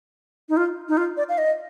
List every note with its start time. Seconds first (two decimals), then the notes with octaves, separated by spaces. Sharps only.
0.49 D#4
0.57 F4
0.89 D#4
0.97 F4
1.17 D5
1.29 F5
1.38 D#5